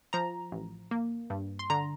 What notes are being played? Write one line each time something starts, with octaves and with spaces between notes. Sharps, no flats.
F3 A#5
A1
A#3
G2
C6
D3 A#5